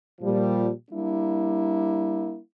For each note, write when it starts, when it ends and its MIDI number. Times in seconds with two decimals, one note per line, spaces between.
0.21 0.70 46
0.21 0.70 53
0.21 0.70 55
0.91 2.37 55
0.91 2.37 58
0.91 2.37 62
0.91 2.37 64